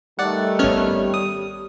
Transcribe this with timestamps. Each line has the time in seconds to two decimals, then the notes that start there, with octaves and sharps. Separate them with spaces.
0.19 D#3 G3 A3 D5 F#5
0.59 G#1 B3 C#4 C#5 F6
1.14 D#6